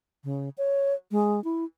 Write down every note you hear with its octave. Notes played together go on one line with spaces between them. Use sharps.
C#3
C#5
G#3
E4